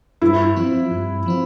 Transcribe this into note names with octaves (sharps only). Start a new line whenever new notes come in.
G2 E4
F3 C4 F4
G2
F3 C4 F4